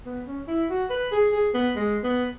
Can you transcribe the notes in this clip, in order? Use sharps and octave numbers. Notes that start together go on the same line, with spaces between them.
B3
C#4
E4
F#4
B4
G#4
G#4
B3
G#3
B3